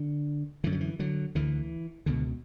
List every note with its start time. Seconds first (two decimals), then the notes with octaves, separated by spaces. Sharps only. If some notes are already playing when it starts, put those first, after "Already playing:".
Already playing: D3
0.64 F#2 D3 E3
0.72 F#3
0.80 E3
0.99 D3 F#3
1.35 D2 D3 E3
2.06 C#2 B2 D3